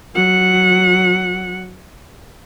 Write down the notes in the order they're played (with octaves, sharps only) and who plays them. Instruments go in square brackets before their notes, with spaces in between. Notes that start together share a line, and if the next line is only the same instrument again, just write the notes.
[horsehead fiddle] F#3 F#5